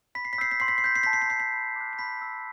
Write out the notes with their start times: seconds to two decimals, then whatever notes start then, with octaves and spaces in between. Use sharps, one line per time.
0.15 B5 B6
0.25 C7
0.33 B6
0.38 E6 G6 C7
0.51 B6
0.60 C6 C7
0.68 B6
0.78 C7
0.84 G6 B6
0.95 C7
1.03 A5 B6
1.13 C7
1.22 B6
1.29 C6 G6 C7
1.40 B6
1.53 B5
1.76 D6 F#6
1.93 C7
1.99 B5 B6
2.21 E6 G6